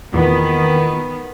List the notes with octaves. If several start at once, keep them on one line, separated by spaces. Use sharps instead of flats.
E2 A#2 D#3 B3